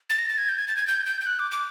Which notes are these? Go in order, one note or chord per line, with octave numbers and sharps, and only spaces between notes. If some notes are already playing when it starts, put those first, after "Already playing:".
A6
A#6
A6
G#6
G6
G#6
A6
G#6
G6
G6
G6
F#6
D6
D6